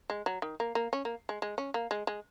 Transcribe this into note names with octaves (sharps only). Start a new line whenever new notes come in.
G#3
F#3
D#3
A#3
A#3
C#4
A#3
G#3
G#3
C#4
A#3
G#3
G#3